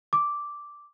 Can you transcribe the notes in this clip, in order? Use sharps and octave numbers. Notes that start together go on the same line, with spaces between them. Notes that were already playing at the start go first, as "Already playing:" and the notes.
D6